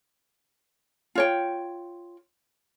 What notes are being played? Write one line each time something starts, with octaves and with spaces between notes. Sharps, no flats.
F4 C#5 G5